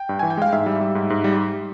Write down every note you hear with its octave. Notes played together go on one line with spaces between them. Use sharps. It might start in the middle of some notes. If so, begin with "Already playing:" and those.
Already playing: G5
G2
E3 G#5
G5
G#3 F5
G#2 E5
G3
G3
G#2
G#2
G3